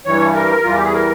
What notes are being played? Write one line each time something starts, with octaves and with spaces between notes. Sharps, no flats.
G2 E3 G3 C#5
A#4
E2 E3 G3 F4
G4
G#4
A#4